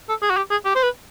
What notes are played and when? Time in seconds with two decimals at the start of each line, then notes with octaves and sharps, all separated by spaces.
0.09 A4
0.22 G#4
0.30 F#4
0.37 G4
0.51 G#4
0.65 G4
0.75 C5
0.83 B4